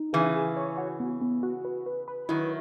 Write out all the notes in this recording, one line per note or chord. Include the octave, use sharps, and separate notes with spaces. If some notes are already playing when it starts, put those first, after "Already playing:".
Already playing: D#4
C#3 E3 G#4
G#4
C#5
F#4
B3
B3
F#4
B4
B4
B4
D#3 F#3 E4